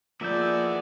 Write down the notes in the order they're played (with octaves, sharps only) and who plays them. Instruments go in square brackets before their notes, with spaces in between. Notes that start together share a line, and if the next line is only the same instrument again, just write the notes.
[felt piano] F3 [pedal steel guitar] A#3 E5 G6 [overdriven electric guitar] B3 E4 [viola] G#4 D5